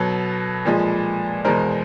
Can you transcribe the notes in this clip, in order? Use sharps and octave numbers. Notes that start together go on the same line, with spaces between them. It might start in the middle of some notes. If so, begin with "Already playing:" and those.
Already playing: B2 F#3 A4 B4
A#2 F3 G#3
E2 B2 G#3 A#4 C5